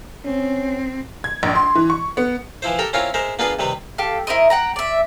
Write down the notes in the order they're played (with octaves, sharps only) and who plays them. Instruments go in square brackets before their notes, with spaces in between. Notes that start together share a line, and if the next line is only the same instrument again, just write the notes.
[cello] C4 [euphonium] C#4
[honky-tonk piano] G#6
A#1
C6
E3
C#6
B3
[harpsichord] E3 F3 E4 C5
G4 A4 A#4 G5
C4 C#4 E4 F4 A#4 C#5
G#3 A#4 C5 E5
A#3 B3 D4 F4 G#4 B4
C3 D#3 G3 B4
[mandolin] G4 A4 F5
E4 A#4 C5 D#5
F#5 G5 A#5
D5 E5